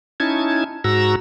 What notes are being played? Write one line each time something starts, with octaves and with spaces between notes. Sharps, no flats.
C#4 D#4 E4 A5 G#6
G#2 F#4 A#5 E6